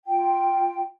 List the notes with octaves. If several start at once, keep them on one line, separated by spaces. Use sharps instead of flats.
F4 G5